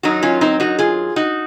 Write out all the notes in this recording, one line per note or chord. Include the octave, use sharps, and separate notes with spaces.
F#2 D#3 F#3 D#4 F#4
C#4 F4
C4 D#4
D#4 F#4
F4 G#4
D#4 F#4